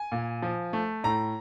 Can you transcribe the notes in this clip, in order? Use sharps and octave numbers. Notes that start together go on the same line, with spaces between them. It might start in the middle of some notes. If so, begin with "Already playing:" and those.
Already playing: G#5
A#2
F3
A3
A2 A#5